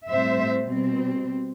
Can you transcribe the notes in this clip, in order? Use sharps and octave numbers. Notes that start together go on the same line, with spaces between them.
A2 G3 C4 C5 E5
B2 G3 C4